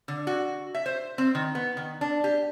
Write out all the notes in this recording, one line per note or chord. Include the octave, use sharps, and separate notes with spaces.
D3
F#4
E5
C5
C4
D#3
B3
D#3
D4
G4